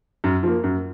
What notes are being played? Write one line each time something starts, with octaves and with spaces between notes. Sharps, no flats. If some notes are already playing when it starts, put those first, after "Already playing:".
F#2
F3 A#3
F#2